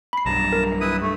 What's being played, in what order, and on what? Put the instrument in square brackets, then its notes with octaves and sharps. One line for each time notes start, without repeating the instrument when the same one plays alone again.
[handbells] B5 C7
[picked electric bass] B1 G2 [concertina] A5 A#5
[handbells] A#4
[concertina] E4 B4 D#6
[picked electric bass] G2 [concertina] A3